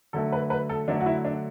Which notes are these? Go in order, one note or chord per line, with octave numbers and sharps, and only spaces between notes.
D3 F#3 A3 A4
B4
B4
A4
D3 F#3 A3 D4
F#4
E4
D4